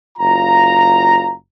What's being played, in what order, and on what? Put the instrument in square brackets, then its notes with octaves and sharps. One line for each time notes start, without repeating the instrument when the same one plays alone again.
[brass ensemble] F#1 F4 F5 A#5